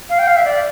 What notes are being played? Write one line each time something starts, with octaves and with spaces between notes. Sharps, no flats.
F5
G5
F5
E5
D5